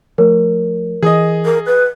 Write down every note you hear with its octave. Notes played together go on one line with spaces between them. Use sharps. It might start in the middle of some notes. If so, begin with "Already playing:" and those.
F3 A3 A#4 C#5
E3 G#4 D#5 D#6
A#4
B4 F#6